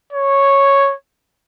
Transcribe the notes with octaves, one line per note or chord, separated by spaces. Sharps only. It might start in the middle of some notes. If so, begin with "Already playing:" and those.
C#5